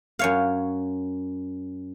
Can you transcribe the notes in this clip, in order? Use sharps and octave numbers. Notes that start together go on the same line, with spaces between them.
F#2 C#5 F5